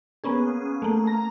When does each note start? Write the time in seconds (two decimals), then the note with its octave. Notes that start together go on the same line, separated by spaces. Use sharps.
0.24 A#3 B3 C#4 G#4
0.82 A3 A#3
1.07 A#5